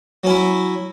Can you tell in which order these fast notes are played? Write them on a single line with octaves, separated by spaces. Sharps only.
F#3 C#4 E4